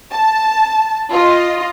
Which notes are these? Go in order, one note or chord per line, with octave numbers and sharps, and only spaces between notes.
A5
F4 D#5